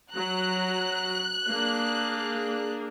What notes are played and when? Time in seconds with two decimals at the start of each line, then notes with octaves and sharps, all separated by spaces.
0.13 F#3 A#5 F#6
1.47 A#3 D4 G#4